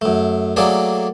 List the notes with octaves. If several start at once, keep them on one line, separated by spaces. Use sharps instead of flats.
F#2 A3
F#3 A3 A#3 G#4 A4 D5